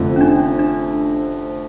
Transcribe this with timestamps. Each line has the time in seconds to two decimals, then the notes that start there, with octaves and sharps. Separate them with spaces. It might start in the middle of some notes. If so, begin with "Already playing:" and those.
Already playing: F1 F2 D3 F3 A3
0.16 C#4
0.21 D4
0.59 D4